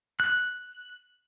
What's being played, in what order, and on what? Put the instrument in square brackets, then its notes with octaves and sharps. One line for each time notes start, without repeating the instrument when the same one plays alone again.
[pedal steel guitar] F#6